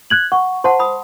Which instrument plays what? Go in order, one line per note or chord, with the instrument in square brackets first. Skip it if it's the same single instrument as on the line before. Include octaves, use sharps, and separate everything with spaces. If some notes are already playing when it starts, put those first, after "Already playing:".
[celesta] F#6 G#6 F#7
[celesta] F#5 [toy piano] C#6
[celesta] C5 [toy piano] F#5 A5 C6
[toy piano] B5 D#6